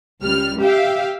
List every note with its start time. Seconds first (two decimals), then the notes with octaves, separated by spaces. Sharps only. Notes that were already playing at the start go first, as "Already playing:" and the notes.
0.24 C#2 G3 F6
0.61 G4 E5 F5 G5